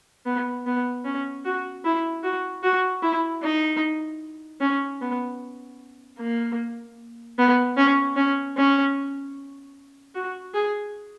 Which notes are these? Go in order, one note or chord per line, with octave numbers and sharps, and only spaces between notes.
B3
B3
C#4
F#4
E4
F#4
F#4
E4
D#4
C#4
B3
A#3
B3
C#4
C#4
C#4
F#4
G#4